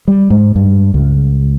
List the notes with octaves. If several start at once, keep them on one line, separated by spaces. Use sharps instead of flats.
G3
G#2
G2
C#2